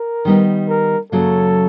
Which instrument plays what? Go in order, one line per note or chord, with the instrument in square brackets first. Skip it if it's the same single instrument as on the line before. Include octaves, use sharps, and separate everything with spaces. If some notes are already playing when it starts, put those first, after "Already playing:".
Already playing: [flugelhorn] A#4
[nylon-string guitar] D#3 G3 B3 D#4
[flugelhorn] A#4
[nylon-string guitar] F#2 C#3 F#3 A#3 [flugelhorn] A4